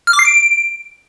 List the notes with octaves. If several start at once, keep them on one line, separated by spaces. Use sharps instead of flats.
F6
D6
C7
D7